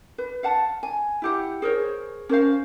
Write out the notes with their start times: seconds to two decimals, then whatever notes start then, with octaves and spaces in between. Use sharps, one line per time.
0.18 B4
0.43 F5 F#5 A5
0.83 G#5
1.22 E4 G4 F#5
1.62 G#4 A#4 C5 C#5
2.29 C#4 A#4 C5 F5